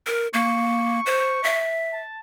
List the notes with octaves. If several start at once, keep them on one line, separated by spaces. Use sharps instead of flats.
A#4
A#3 C#6
C5
E5
A5